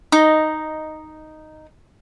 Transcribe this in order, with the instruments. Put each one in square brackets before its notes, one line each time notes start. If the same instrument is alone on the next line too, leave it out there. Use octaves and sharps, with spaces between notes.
[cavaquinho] D#4 D#5